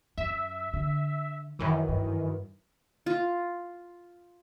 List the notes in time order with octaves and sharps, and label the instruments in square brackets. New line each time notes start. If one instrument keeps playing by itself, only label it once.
[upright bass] F#2 [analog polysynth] E5
[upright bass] D3
[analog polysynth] F#2 D#3 E3 [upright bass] G3
[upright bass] G2
[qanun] F4